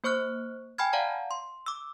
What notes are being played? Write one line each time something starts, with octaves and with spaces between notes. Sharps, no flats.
A#3 C5 C#6 F6 F#6
G5 G#5 B5 F6 G#6
D5 F5 F#5 A5 A#5
C6
D6 E6